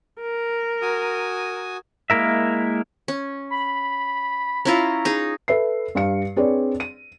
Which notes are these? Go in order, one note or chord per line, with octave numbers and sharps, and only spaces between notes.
A#4
F#4 G#5 D#6
G#3 A#3 E4 A#4 E5
C#4
B5
C#4 E4 F4 A#5
D#4 G#4
A4 B4 E5 C7
G2 F5 C#7
C4 D4 G#4 B4 C#5 D5
D#7